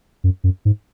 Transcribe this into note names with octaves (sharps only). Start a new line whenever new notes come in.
F#2
F#2
G#2